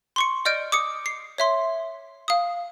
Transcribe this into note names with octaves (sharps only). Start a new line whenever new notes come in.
C6 C#6 C#7
D5 D#5 F6 G6 D7
D6 D#6 C#7
C7
C#5 E5 C6
F5 D#6